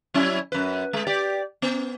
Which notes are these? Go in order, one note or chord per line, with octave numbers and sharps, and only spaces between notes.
F#3 C#4 E4
F#2 B4
G#3
G4 D5
B3